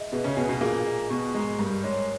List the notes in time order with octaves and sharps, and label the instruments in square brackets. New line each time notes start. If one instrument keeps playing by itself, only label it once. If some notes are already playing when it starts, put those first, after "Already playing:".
Already playing: [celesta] G#4 D#5 E5
[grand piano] B2 B3 [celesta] G#4
[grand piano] C#3 C#4
[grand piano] B2 B3 [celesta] G#5
[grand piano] B2 B3
[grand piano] A#2 A#3 [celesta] G#4
[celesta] D#5
[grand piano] B2 B3 [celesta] C#6
[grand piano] G#2 G#3 [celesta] A#5
[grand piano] G2 G3 [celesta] A#4
[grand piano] G#2 G#3 [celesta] C#5